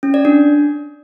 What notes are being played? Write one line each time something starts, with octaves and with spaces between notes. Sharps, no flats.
C#4
D5
D4